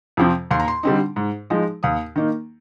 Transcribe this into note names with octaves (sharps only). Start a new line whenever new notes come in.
F2 C3 F3 C4
D#2 C6
A#5
C6
D3 G3 C4 D#4
G#2
F3 G#3 D#4
D#2 D#6
D#3 A#3 D#4